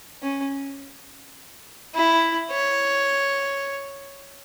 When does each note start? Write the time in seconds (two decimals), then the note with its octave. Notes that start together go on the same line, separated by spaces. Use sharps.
0.23 C#4
1.95 E4
2.51 C#5